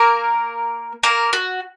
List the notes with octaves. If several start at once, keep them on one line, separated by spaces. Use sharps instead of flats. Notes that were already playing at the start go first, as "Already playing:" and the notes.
Already playing: A#3 A#4
A#3 A#4
F#4